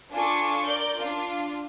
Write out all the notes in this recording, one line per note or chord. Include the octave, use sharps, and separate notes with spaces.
D4 F4 A4 G#5 C#6 D6
A#4 D5 G6
D4 F4